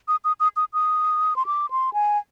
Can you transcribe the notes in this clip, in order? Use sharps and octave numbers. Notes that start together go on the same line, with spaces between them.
D#6
D#6
D#6
D#6
D#6
C6
D6
C6
G#5